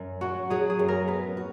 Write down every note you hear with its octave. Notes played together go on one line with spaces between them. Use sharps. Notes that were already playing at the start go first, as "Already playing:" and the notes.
Already playing: F#2
F#3 F#4
F#3 G#4
G#4
F#2
A#4
B3 B4
F#4